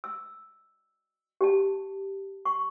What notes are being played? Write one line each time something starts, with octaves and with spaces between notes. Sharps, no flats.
E6
G4 A5
C#6